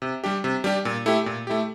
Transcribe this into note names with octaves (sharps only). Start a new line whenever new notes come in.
C3
G3 D4 G4
C3
G3 D4 G4
A#2
A3 E4 G4
A#2
A3 E4 G4